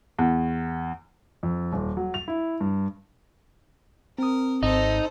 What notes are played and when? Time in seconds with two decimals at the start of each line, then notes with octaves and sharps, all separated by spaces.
0.19 E2
1.43 F2
1.73 D#1
1.97 F#3
2.14 F7
2.28 E4
2.61 G2
4.19 C4 A#4 D#6
4.63 G#1 D#4 A4 C5